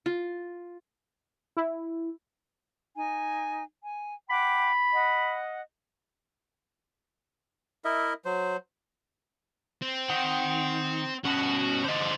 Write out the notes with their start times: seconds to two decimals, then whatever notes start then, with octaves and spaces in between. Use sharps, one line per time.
0.06 F4
1.57 E4
2.97 D#4 G#5
3.85 G#5
4.30 F#5 G5 B5 D6
4.93 D#5 F#5
7.85 E4 A#4 D#5 E5
8.25 F#3 C5
9.82 C4
10.10 D#3 F#5
11.25 G2 B2 C#4 F#4
11.85 D3 F3 C5 D#5